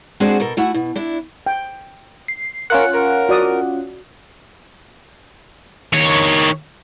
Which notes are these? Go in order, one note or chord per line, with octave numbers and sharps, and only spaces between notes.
G#3 C4 D4 F#4 G#4 C5
B2 A4 A#4
A3 E4 F#4 F#5
B2
D4 E4
G5
C7
C#4 F4 A#4 F#5
A#4
F#4 D5 D#6
D#3 C#5